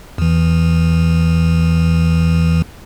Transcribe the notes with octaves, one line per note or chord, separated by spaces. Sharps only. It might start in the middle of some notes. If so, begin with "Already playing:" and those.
E2 E3